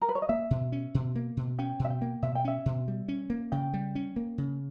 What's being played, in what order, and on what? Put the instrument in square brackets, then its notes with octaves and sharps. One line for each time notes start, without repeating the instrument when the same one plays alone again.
[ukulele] A#4
B4
C#5
D#5
[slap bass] A#3 [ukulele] E5
[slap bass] B2
C#4
B2
A#3
B2
[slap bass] C#4 [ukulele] G5
[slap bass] B2
[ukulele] E5
G5
[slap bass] A#3
[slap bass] B2 [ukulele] E5
[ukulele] G5
[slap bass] C#4 [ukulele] E5
[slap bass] B2
G3
C#4
A#3
[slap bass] C#3 [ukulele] G5
[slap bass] G3
C#4
A#3
C#3